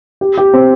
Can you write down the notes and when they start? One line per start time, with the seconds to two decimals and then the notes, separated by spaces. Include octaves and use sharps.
0.21 G4
0.37 G4
0.54 C4